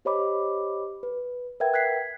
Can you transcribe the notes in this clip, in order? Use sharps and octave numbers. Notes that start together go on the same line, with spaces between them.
G4 C5 C#5 D#5 B5 D6
B4
A#4 B4 E5 F#5 G5 G#6
F#6 G#6 B6 C7